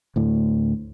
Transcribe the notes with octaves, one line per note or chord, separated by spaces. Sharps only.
D2 A2